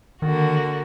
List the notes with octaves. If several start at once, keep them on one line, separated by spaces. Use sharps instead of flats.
D3 D#3 A#3 F#4